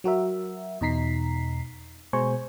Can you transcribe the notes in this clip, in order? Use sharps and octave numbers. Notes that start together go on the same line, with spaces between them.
F#3 F#4 A#4 E5
E2 B2 D#4 A#5 B6 C7
B2 G#3 C5 G#5 C#6